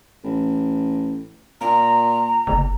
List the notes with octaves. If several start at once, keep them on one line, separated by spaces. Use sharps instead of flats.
A1
A#2 A#5
F#1